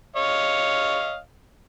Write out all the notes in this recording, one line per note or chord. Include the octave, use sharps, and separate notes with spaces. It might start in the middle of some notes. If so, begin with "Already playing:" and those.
C#5 D#5 F5